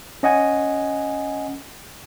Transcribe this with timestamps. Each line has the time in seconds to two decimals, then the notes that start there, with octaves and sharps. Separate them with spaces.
0.23 C#4 D#5 F#5 G#5